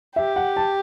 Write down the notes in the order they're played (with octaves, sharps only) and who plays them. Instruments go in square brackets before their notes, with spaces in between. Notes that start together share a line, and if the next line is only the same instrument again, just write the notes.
[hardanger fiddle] G4 [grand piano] E5
[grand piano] F#5
A5